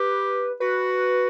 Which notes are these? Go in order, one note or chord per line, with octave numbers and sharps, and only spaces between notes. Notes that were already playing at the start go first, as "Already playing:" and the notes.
Already playing: G4 B4
F#4 B4